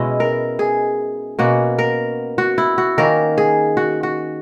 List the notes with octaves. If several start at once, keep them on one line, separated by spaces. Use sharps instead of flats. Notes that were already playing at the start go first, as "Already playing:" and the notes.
Already playing: B2 G#3 C#4 E4 D#5
A#4
G#4
B2 A#3 C#4 F#4
A#4
F#4
E4
F#4
D#3 A#3 C#4 A#4
G#4
F#4
F#4